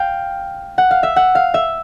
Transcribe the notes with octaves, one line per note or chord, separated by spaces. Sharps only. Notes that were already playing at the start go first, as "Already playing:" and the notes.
Already playing: F5 G5
F#5
F5
E5
F#5
F5
E5